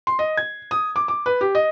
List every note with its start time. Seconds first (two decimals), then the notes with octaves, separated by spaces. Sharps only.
0.07 C6
0.19 D#5
0.37 G#6
0.71 D#6
0.96 D6
1.08 D6
1.26 B4
1.41 G4
1.55 D#5